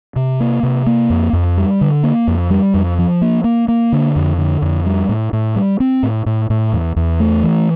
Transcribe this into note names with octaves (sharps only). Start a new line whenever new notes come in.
C3
A#3
C3
A#3
F2
F2
G3
D3
A#3
F2
G3
F2
F3
A#3
A#3
A#3
D3
F2
D3
F2
G3
A2
A2
G3
C4
A2
A2
A2
E2
E2
A3
E3